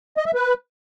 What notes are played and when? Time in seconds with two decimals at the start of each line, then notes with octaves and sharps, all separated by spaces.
0.17 D#5
0.26 E5
0.34 B4